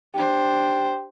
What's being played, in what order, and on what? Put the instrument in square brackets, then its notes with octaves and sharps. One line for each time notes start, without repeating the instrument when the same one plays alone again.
[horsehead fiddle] D4 C5 [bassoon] G4